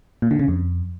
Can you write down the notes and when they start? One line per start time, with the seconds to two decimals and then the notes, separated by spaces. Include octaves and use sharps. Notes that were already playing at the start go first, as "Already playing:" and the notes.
0.22 A#2
0.31 D3
0.39 C#3
0.48 F2